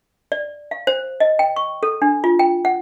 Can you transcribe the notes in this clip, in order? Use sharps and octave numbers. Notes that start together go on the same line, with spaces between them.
D5
F5
C5
D#5
G5
C#6
A4
D4
F4
G5
F#5